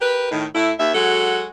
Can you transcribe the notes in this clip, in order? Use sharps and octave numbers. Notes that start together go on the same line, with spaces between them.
G4 A#4 B4
A2 D#3
A2 E4
D#2 E5
F#3 G#3 F#4 A4 F#5